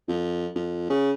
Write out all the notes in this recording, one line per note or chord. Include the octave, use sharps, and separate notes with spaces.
F2
F2
C#3